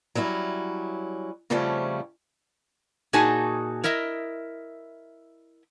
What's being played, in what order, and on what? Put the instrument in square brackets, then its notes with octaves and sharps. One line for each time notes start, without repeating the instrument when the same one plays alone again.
[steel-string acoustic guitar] F#3 G3 C#4 E4
F2 C#3 F3 G3 A3 C#4
[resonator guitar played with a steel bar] A#2 D#4 F#4 G#4 G#5 A5
E4 A#4 D#5 E5